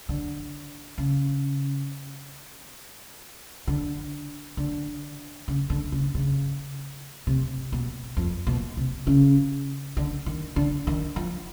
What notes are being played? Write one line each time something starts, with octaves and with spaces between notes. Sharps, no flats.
D3
C#3
D3
D3
C#3
D3
C#3
C#3
C3
B2
F2
B2
C3
C#3
D3
D#3
D3
D#3
F3